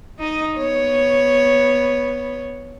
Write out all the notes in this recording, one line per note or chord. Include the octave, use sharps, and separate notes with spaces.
D#4 D#5
B3 C#5